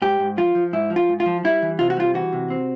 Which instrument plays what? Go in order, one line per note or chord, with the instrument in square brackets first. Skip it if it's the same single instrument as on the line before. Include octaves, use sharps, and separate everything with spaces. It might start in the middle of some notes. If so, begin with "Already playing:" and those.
[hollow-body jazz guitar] G#2 G4
G#2
F3 F4
F3
G#2 E4
F3
F4
G#2
F4
F3
G3 E4
E3
C3 F4
F#4
G3 F4
E3 F#4
C3
C4